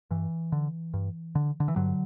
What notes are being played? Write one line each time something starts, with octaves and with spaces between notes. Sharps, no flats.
G2 E3
D3
G2
D3
D3
E3
G2 D3 F#3